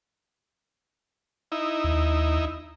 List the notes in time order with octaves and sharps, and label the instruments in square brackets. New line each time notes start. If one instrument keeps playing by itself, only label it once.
[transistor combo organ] D#4 E4
[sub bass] D#2